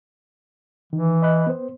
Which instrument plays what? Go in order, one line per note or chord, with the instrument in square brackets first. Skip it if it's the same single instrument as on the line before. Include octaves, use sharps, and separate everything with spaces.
[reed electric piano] D#3 [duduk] E3
[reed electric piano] D#5 B5 F#6
B3 C5